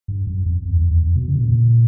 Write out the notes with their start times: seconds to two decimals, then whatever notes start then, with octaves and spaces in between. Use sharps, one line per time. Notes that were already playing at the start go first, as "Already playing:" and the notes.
0.08 G2
0.27 F#2
0.46 F2
0.65 E2
0.78 F2
0.91 E2
1.03 F2
1.15 B2
1.28 C#3
1.35 B2
1.40 A#2